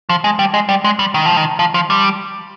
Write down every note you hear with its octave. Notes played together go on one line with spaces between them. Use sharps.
F3
G#3
G3
G#3
G3
G#3
G3
D#3
F3
D#3
F3
F3
G3